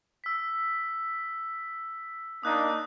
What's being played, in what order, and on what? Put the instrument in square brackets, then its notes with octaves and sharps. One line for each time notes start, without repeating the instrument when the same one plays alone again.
[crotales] E6 B6
[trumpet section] A#3 D4 D#4 [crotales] D#6 F#6